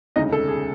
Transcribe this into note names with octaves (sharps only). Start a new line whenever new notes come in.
E1 D2 C#3 D#4 D#5
A4
G#4